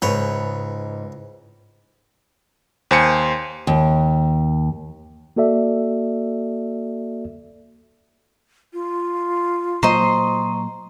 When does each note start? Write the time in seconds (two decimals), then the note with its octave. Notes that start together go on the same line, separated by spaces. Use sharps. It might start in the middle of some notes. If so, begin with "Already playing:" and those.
0.02 C#2 G#2 B4 C#5
2.91 D#2 C5 G#5 C6 C#7
3.67 D#2
5.36 A#3 F#4 A4 D5 E5
8.73 F4
9.83 A#2 F#3 A#3 C5 D#5 A#5 C6 C#6